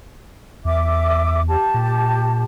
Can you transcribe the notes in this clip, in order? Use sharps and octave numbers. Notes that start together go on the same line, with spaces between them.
E2 E5 D6
G4 A5
A#2